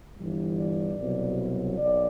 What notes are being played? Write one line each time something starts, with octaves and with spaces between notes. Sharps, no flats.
G1 G2 E3 G3
D5
C2 B2 F#3
B1 D5